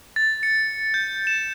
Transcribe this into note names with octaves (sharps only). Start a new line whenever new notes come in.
A6
C#7
G6
E7